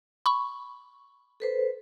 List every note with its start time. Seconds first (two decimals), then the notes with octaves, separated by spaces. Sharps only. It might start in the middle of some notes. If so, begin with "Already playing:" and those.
0.26 B5 C#6
1.40 A4 B4 C5